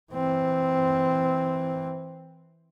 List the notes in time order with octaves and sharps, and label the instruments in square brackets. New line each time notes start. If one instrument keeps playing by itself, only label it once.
[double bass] E3 C4